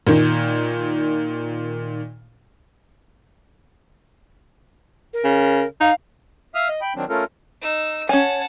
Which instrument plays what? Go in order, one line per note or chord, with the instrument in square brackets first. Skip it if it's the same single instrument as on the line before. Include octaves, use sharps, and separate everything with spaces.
[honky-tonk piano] A#2 D#3
[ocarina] A#4
[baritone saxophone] C#3
[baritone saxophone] D#4 [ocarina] F5
[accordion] E5 F5 D#6 F6
D#5
G5 B5
D#3 F#3 C4 D4
A3 C#4 F4 A4 A#4
[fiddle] D#4 E6
[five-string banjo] C#4 G#5 [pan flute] C#5 [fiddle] F#5 A5